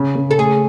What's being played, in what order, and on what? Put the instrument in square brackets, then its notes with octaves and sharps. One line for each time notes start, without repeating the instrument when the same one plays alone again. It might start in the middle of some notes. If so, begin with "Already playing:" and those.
Already playing: [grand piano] C#3
C#3
[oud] A4
[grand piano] A3 [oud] G#4